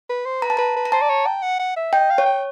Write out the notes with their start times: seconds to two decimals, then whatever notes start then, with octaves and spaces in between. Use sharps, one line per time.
0.09 B4
0.26 C5
0.42 B4 A#5
0.50 A5
0.57 B4 A#5
0.76 B4
0.85 A#5
0.92 C5 A5
1.01 D5
1.09 C#5
1.27 G5
1.42 F#5
1.59 F#5
1.76 E5
1.93 D#5 G5
2.10 F5
2.18 C#5
2.26 G5